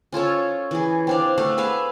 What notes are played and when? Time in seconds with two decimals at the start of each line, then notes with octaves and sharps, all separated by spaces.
0.12 C#4 F4 A4 C#5
0.71 E3 G#4
1.07 C4 D4 F5
1.38 A3 F5 F#5
1.58 G#4 B4 E5 F5